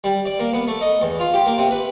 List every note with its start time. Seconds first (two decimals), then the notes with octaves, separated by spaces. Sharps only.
0.04 G3
0.26 D5
0.39 A#3
0.53 B3
0.68 A3
0.81 D#5
1.02 E2
1.20 F4
1.34 G4
1.46 A#3
1.58 C3
1.71 B4